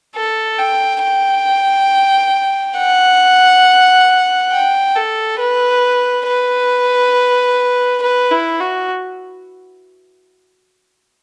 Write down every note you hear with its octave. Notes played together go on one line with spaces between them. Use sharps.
A4
G5
G5
F#5
G5
A4
B4
B4
B4
E4
F#4